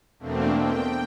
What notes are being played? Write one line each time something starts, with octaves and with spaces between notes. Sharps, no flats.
E2 B2 A3 A#3 C4 D4
G5